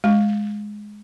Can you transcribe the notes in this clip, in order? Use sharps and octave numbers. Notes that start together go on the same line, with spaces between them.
G#3